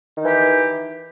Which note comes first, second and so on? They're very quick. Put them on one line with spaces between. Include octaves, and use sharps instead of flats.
D#3 D#4 E3 G4